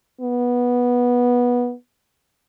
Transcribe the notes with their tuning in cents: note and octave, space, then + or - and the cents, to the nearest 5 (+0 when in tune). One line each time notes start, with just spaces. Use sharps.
B3 -15